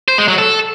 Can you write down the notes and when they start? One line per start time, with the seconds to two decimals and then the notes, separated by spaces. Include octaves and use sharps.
0.08 C5
0.18 G#3
0.28 F#3
0.38 A4